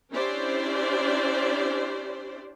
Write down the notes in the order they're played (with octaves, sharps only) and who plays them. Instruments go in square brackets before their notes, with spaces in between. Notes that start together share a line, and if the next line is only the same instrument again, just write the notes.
[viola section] C#4 D4 E4 G4 C5 D5